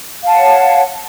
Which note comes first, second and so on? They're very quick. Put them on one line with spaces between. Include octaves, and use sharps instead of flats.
F5 A5 F#5 C#5